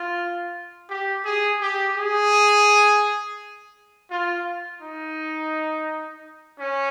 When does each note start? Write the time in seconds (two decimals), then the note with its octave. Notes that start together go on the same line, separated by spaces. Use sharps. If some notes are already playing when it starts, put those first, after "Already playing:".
Already playing: F4
0.89 G4
1.25 G#4
1.61 G4
1.97 G#4
4.10 F4
4.81 D#4
6.59 C#4